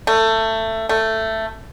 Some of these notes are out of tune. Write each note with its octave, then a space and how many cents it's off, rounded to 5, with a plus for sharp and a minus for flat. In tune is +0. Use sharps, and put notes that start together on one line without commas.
A3 +20
A3 +10